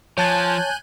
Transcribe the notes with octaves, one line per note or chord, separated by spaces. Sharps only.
F3 C#5 G#5 A5 F#6 G6 A6